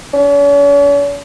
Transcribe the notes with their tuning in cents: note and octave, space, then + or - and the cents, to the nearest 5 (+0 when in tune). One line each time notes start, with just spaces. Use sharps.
C#4 +45